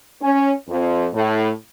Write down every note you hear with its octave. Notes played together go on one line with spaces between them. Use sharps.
C#4
F2
A2